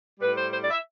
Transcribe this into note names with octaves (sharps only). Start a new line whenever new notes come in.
A2 G3 B4
C5
C5
D5
E5